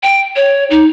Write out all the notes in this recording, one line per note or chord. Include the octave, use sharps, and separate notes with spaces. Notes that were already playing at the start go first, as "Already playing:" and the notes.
G5
C#5
D#4